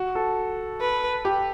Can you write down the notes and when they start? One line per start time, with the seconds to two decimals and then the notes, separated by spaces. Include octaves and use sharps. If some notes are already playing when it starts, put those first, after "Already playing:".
Already playing: F#4
0.15 A4
0.81 B4
1.25 G4